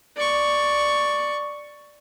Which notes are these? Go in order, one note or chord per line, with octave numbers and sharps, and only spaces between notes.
D5 C#6